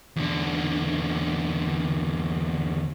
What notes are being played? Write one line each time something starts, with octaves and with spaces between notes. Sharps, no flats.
E2 D3